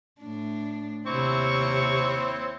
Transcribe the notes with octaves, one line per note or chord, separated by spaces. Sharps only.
A2 D4
D#2 C3 C4 E4 C#5 C#6